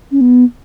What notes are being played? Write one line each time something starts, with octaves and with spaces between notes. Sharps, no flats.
C#4
B3